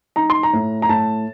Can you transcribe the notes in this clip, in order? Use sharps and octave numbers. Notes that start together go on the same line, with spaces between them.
D#4 A#5
C6
A#5
A2
A#5
A2 A5